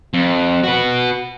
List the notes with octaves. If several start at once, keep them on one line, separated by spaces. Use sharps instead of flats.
F2
F#4 B4